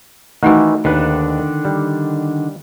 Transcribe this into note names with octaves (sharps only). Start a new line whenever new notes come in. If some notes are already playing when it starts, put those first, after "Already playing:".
D#3 E3 A3 D#4 F#4
D#2 D3 D#3 D4 B4
G3